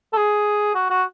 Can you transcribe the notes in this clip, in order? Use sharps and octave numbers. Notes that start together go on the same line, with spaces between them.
A4
G#4
F#4
F#4